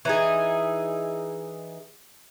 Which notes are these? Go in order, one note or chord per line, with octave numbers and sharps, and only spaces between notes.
E3 D#4 G#4